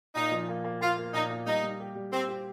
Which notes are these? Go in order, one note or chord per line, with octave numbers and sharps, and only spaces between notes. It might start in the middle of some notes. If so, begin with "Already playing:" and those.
A#2 D#4
F3
A#3
A#3
A#3 F4
A#3
A#2 D#4
A#3
G3 D#4
G3
G4
G3
C4 G4
G4